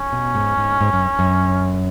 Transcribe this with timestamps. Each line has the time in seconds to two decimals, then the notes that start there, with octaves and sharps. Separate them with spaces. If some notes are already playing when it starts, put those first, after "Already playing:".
Already playing: C#4
0.12 B2
0.35 G#2
0.57 G#2
0.81 G#2
0.93 F#2
1.19 F#2